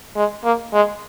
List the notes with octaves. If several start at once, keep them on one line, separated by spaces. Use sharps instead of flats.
G#3
A#3
G#3